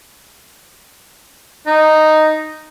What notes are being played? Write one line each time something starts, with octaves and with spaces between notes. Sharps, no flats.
D#4